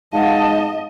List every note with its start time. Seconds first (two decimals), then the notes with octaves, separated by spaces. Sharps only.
0.13 G#2 D#5 F5 F#5 A5